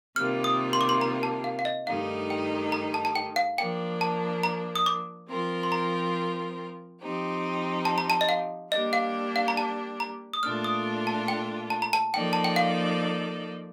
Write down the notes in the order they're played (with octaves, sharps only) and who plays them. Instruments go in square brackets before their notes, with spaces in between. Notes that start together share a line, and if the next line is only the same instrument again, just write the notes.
[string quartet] C3 D#3 G3 A#3 F4 [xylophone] F6
[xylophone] D#6
C6
D6
C6
A#5
A5
F5
F5
D#5
[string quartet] G2 D#3 A3 D#4 G4 [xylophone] F5
[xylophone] G5
A#5
A5
A5
G5
F5
[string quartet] F3 A#3 D4 [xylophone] G5
[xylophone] A5
A#5
D#6
D6
[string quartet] F3 C4 F4 A#4
[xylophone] C6
A#5
[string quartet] F3 C4 D#4 G4
[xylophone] A5
A#5
A5
D#5
F5
[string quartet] G3 A#3 D4 G4 [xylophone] D#5
[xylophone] F5
F5
A#5
A5
A#5
D#6
[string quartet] A#2 A3 D4 F4 A4 [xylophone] F6
[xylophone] D#6
A5
G5
A5
A#5
A5
[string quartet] F3 A#3 D#4 A4 D5 [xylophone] G5
[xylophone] A5
G5
F5